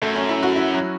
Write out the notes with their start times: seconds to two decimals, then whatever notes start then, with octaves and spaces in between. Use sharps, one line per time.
0.02 F#2 A3
0.15 C#4
0.29 E4
0.43 F#4
0.56 E4
0.74 F#3